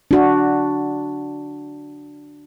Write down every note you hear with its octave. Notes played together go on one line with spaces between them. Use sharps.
D4 F#4